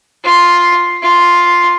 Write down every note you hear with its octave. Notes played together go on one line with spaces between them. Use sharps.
F4
F4